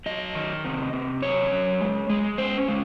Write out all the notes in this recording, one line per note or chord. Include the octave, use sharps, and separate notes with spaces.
F#3 D#5
D#3
C3
C3
F#2 C#5
F#2
G#3
G#3
C#4 C5
G#3